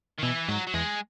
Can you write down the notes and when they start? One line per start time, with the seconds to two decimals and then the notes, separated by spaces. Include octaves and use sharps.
0.18 D#3
0.22 B2 E3
0.48 G#2 F#3
0.67 F#3
0.74 E2 G#3